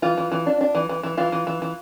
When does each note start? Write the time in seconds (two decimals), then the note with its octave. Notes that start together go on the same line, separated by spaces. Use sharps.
0.02 E3 F4
0.18 E3
0.32 E3
0.46 D4
0.61 D4
0.75 E3
0.89 E3
1.03 E3
1.17 E3 F4
1.32 E3
1.47 E3
1.62 E3